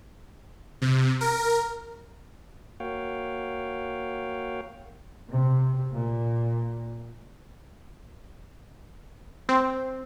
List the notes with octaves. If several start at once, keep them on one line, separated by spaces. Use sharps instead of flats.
C3
A#4
A#3 F#4 C#5 F5 G5
C3
A#2
C4